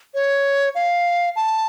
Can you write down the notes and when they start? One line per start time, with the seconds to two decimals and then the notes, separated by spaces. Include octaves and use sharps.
0.14 C#5
0.75 F5
1.36 A5